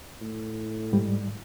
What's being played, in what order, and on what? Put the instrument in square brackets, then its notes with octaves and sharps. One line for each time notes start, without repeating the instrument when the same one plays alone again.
[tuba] A2
[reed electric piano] G#2 G3